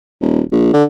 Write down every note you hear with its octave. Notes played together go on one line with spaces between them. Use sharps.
D#1
A#1
D3